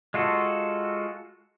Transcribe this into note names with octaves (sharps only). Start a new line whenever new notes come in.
G#3 F4 F#4 A4